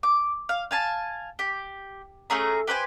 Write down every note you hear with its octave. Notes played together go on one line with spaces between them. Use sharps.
D6
F5
F5 G#5 A5
G4
A3 C#4 G#4 A#5
G4 B4 C5 G#5